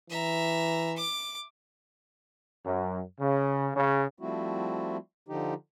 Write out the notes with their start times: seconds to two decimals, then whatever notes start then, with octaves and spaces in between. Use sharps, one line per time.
0.10 E3 E5 A#5
0.97 D6
2.64 F#2
3.19 C#3
3.75 C#3
4.19 F3 G3 A3 C4 E4 F#4
5.28 D3 F3 D#4 G4